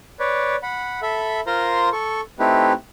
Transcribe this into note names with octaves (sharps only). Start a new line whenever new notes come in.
B4 C#5 D5
F#5 B5
A4 E5 B5
F4 A#4 C5 A#5 C6
A4 C#6
A3 C4 D#4 E4 G4 B4